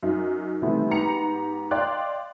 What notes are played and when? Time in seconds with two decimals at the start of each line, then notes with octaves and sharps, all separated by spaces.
0.03 F#2 D#4
0.62 C3 D#3 E3 G3 A3 B3
0.90 G#2 B3 G4 A#5 C#7 F7
1.71 D5 D#5 F5 G5 C6 F#6